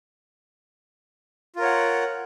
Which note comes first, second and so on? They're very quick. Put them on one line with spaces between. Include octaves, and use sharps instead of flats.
F4 A#4 C#5 F#5